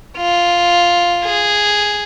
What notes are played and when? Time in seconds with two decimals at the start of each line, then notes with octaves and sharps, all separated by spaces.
0.17 F4
1.24 G#4